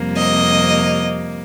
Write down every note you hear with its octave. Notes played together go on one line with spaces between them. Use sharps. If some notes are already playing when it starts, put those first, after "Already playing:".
Already playing: F2 C3 G3 A#3
D#5